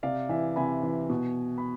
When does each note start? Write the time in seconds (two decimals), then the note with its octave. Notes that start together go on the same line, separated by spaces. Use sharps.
0.03 C3 D5 F5
0.29 E3 E5 G#5
0.56 C3 G#5 B5
0.83 E3
1.09 B2
1.58 B5